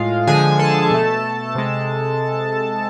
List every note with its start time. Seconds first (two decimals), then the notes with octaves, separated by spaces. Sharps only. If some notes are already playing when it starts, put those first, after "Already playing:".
Already playing: A2 G#3 F4 F5
0.27 D3 F3 G#3 G#4 G#5
0.59 A4 A5
0.91 B2 A3
1.55 C3 G#3